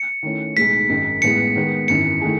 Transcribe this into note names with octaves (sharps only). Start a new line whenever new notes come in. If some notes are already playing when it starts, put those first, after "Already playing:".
Already playing: C#7
D#3 A3 C#4 E4
B1 A2 G#3 D#4 B6
G#1 F#2 D#3 G#3 D#4
A1 A2 G#3 B3 E4 C#7
D#3 G#3 B3
G#1 F#2 E3 C#7
D#3 A3 E4 G#4